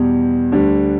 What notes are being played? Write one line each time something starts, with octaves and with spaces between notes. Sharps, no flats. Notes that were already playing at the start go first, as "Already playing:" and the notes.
Already playing: E2 B2 G3
D2 D3 G3